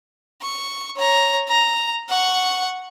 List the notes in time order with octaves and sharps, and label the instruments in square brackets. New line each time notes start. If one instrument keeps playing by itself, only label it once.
[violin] C#6
C#5 A#5
A#5
F#5 C#6